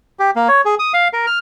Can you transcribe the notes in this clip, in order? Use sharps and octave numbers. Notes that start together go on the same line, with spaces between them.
G4
A#3
C#5
G#4
D#6
F5
A#4
F6